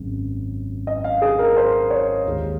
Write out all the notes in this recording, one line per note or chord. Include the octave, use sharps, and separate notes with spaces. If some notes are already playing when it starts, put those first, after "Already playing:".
Already playing: G#1 F#2 C#3
D#5
F5
G#4
A#4
C5
C#5
D#2 D#3 G#3